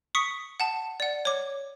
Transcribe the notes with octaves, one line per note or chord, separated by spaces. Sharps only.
C#6 D#6 B6 C#7
F#5 A5
D5 F#5
C#5 D6